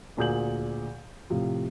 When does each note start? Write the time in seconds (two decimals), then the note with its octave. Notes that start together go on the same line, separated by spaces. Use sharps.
0.17 D2 A#2 G#4 G6 F#7
1.30 A2 C3 F3